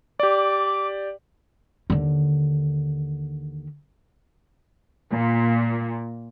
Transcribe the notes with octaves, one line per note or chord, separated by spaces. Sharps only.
G4 D5 D6
D#2 D3
A#2